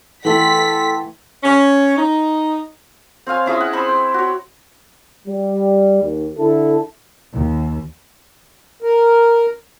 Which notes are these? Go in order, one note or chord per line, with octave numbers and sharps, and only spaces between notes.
E3 A3 A4 F#5 G5 C6 B6
C#4
D#4
C4 C#5 F5 G#5
C#4 E4 G#4 D#5
F#5
C4 E5 B5 C6
G5
F#4 C#5
G3
D#2
D3 E4 A4
D#2
A#4